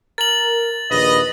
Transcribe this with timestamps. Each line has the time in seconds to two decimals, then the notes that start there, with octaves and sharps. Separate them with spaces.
0.18 A#4 A6 F#7
0.91 A#1 D#2 B4 D#5